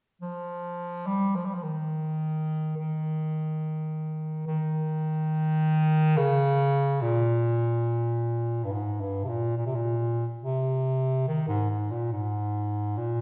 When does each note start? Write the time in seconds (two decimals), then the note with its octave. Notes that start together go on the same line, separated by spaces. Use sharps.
0.21 F3
1.06 G3
1.35 F3
1.45 G3
1.54 F3
1.63 D#3
2.77 D#3
4.47 D#3
6.17 C#3
7.02 A#2
8.64 G2
8.72 G#2
9.00 G2
9.24 C3
9.29 A#2
9.57 A#2
9.66 C3
9.75 A#2
10.42 C3
11.27 D#3
11.48 G#2
11.70 G#2
11.91 A#2
12.12 G#2
12.97 A#2